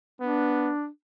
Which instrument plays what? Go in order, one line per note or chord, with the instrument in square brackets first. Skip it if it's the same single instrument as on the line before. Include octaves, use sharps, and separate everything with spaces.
[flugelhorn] B3 [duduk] D4